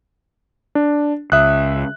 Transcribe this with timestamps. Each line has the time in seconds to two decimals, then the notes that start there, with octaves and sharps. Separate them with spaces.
0.75 D4
1.32 C#2 E5 D#6 F#6